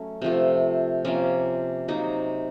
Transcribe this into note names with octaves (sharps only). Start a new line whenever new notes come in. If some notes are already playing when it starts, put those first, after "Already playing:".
Already playing: F#3 A3 C#4
C3 F3 A3
C3 F3 A#3 C#4
C3 F#3 A#3 D#4